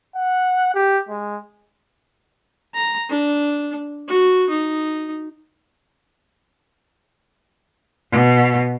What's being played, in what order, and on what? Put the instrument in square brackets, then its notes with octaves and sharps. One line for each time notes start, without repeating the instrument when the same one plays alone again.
[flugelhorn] F#5
G4
G#3
[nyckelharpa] A#5
D4
F#4
D#4
[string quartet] B2